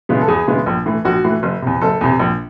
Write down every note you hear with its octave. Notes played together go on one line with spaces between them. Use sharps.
C#3 E3 G#3 B3
A4
E2 G#4
C#3 E3 G#3 B3
A#1
A2 E3
A#1 F#4
A2 E3
F#1
E2 C3
F#1 A4
E2 C3
A#1